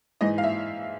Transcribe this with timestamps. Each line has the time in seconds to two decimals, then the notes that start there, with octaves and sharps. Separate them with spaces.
0.21 G#2 E3 D#5
0.38 F5
0.44 E5